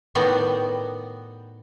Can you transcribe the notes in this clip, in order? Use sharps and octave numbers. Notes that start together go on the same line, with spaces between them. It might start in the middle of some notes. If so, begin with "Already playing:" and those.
A2 D#3 B3 F#4 D5 G5